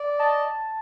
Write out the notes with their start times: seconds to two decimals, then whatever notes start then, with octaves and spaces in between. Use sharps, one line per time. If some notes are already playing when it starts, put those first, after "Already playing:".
Already playing: D5
0.19 D#5 A5